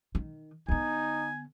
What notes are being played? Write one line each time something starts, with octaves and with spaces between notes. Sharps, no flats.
D#3
D3 B3 D#4 G#5